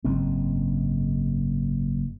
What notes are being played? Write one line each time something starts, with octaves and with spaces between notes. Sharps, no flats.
F#1 G#2 G#3 C4